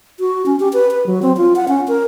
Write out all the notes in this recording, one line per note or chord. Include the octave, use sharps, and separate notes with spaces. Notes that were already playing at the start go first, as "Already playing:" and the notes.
F#4
C#4
G4
B4
B4
F#3
C4
F4
F#5
C#4
A#4